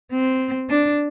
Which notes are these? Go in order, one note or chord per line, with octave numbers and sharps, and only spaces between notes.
C4
D4